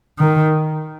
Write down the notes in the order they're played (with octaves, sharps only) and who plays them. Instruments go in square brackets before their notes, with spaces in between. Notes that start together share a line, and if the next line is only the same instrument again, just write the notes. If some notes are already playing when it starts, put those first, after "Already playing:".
[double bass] D#3